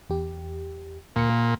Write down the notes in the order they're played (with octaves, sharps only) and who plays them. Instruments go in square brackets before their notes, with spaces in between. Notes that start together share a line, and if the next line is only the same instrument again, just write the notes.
[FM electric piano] E2 G4
[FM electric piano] D2 C#7 [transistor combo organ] A#2
[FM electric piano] A#3